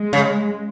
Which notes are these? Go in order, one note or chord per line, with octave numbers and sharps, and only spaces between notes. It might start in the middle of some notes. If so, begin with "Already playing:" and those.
Already playing: G#3
C#3